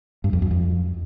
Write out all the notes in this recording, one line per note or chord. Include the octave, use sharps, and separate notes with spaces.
G2
F2
F#2
F2